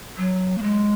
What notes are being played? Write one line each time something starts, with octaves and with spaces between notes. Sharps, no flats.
F#3
A#3
G#3